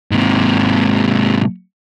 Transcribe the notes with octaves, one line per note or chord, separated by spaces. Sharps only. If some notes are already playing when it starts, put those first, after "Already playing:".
G#2 C3